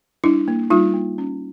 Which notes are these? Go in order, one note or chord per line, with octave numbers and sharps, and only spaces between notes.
G3 D4 E4
A#3
G3 D#4 F4
A#3
C#4